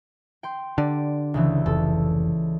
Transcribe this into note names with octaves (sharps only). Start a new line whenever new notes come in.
G5 C6
D3 G4 D5
C#2 C#3 E3
F1 A4